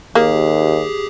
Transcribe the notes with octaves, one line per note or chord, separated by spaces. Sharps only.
D#2 A#3 G4 G#4